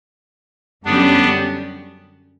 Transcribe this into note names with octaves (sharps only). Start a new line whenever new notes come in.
F#2 D3 G3 B3 C#4 D4 G4